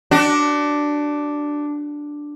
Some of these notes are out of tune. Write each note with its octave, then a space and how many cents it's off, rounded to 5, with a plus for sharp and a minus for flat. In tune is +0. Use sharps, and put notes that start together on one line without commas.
D4 +0 F#4 +35